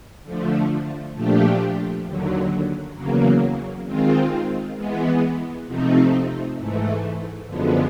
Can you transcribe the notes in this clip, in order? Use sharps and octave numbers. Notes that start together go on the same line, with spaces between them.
D3 F3 A3
A#2 F3 A3 D4 G4
D#2 D3 F#3
E2 C#3 F#3 A#3
D#3 G#3 C4 F4
E3 G#3 B3
C3 F3 A3 C4 D#4
G#2 E3 A3
F#2 D3 F3 G#3 B3